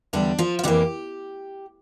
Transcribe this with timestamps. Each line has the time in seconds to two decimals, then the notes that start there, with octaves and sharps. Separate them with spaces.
0.13 E2 D3 G3 D4
0.39 F3 F4
0.59 F4
0.64 F2 E3 G3 A#3 G4